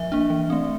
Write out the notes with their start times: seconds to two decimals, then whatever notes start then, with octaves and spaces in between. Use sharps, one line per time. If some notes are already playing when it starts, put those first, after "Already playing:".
Already playing: F3 E5
0.12 A#3 D4
0.30 E3
0.50 A3 C4